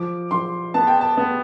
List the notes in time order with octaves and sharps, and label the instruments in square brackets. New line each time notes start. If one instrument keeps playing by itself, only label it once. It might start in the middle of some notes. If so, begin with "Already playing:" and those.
Already playing: [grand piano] F3 [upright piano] D6
[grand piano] F3 [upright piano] C6
[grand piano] B3 [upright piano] A5
[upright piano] G5
A5
[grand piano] B3